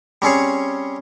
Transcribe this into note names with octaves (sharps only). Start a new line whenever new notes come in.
G3 C4 C#4 G#4 C#5